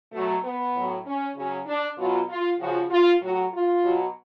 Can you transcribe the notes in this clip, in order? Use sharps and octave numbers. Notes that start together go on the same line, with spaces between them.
B2 F#3 A3
B3
A2 F#3
C#4
C#3 F#3 C#4
D4
B2 F#3 F4
F4
C#3 F3 F#4
F4
A2 F#3 F#4
F4
B2 F#3